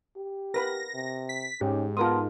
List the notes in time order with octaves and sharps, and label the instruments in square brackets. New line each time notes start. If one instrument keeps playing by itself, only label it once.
[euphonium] G4
[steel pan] A#4 B4 B5 [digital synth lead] A#6
[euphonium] C3
[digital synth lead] B6
[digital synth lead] G#2 [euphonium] C#4 [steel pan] G4
[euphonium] B3 [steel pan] F4 A#4 D#6 [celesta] A5 C6